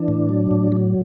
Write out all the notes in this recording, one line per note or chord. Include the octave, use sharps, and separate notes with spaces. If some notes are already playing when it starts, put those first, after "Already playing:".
Already playing: E3 D4
A2
F#3
A2
F#3